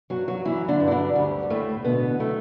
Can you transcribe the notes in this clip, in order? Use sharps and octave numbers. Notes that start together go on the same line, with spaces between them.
G2 F#3 F#4
F#3 F#4
E3 F#3 E4
D3 D4
G2
E4
D3 D4
D2 G3
D2 A2 A3
B2 D3 B3
A2 F#3 A3